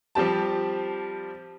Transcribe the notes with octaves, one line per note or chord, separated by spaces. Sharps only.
F3 G3 C4 G4 A5